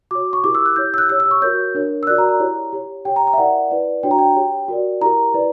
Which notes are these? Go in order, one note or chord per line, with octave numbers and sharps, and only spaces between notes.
F#4 C#5 D6
C#6
E4 G4 A#4 D6
E6
F#6
E4 G4 C#5 G6
E6
F#6
G4 C#5 E6
E6
C#6
F#4 A#4 C#5 G6
D4 A#4 C#5
E6
F#4 A#4 D5 F#6
A#5
A#5
E4 G4 C#5
G4 C#5
G4 C#5 G5
A#5
A#5
E5
E4 A#4 D5 F#5
E4 B4 D5
D4 F#4 C#5 G5
A#5
G5
G4 C#5
F#4 A#4 D5
E4 G4 A#4 A#5
E4 B4 D5